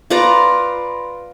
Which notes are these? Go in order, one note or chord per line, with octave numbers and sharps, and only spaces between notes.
F4 B4 D5 A#5